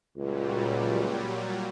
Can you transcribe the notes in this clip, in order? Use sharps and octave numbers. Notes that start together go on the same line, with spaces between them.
C#2 A#2 F#3 G3